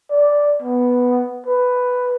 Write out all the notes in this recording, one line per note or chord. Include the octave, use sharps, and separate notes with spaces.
D5
B3
B4